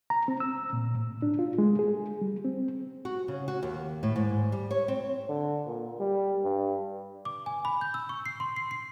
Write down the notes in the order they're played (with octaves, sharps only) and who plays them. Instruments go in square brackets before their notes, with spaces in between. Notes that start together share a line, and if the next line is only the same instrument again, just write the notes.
[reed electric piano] A#5
C4
E6
A#2
A2
D4
F4
G#3
G#4
G3
C4
[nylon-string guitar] F#4
C#3
F#4
D#2
A2
G#2
G3
C#5
C4
[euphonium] D3
A#2
G3
G2
[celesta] D6
G#5
B5
G6
E6
C#6
C7
C6
C7
C7